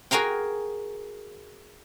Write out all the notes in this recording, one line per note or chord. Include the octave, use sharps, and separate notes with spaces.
F#4 G#4 A#4 F5 G5